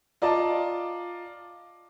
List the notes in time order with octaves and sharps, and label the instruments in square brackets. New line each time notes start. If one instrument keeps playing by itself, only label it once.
[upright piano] F4 D5 D#5 A5 A#5 D6